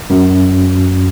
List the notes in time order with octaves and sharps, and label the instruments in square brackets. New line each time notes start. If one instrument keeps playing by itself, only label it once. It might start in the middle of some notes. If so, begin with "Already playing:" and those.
[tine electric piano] F#2